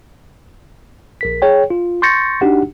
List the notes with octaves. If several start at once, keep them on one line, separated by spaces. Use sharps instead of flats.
A#1 A#4 B6
G#4 C#5 G5
F4
C6 C#6 G6 A6 A#6 C#7
D4 D#4 F#4 G4 F#5